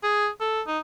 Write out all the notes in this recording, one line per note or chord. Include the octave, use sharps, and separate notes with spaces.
G#4
A4
D#4